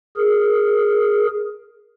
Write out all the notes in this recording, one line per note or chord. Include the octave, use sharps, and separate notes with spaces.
G#4 A#4